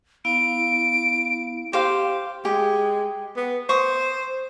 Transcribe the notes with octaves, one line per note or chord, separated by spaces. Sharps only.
B3 E4 F5 D7
G4 C5 F5
G#3 G4
B3
C5 C#6 D#6